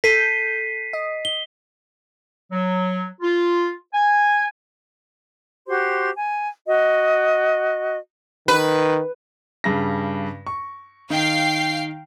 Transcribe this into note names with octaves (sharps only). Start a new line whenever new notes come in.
A4 G6 B6 C7 D#7
D#5
G7
F#3
F4
G#5
F#4 G4 C5 C6
G#5
F#4 D#5
D#3 B4
G2 C#3 A#6
C#6
D#3 F5 G5 C7